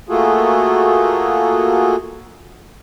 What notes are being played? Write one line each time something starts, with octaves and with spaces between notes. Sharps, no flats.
A3 A#3 F4 F#4 G#4 A4